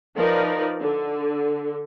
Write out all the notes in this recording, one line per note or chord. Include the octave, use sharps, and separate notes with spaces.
F3 D#4 A#4 B4 D5
D3